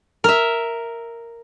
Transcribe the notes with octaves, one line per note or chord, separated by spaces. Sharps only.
A#4 E5